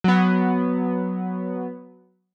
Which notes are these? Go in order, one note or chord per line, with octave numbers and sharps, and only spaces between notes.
F#3 B3